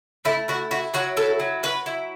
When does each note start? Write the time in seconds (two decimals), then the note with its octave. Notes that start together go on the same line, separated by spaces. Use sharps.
0.25 A3 E4
0.48 E4 F#4
0.71 E4 F#4
0.94 F#3 F#4
1.17 E4 A4
1.40 F#3
1.63 F#3 B4
1.86 E4